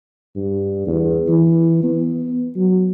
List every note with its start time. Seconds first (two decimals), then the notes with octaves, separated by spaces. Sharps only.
0.36 G2
0.87 E2
1.29 E3
1.83 B3
2.56 F#3